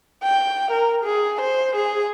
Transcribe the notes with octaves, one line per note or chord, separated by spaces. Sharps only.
G5
A#4
G#4
C5
G#4